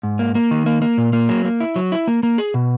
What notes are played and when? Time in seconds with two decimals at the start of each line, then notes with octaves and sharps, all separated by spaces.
0.03 G#2
0.19 A#3
0.35 A#3
0.51 D#3
0.66 A#3
0.82 A#3
0.98 A#2
1.13 A#3
1.29 F#3
1.45 A#3
1.60 E4
1.76 F#3
1.92 E4
2.07 A#3
2.23 A#3
2.38 G#4
2.54 B2